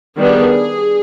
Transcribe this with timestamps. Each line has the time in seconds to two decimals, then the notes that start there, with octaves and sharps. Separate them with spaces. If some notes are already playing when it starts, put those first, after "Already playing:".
0.18 D#3 G3 B3 D4 G#4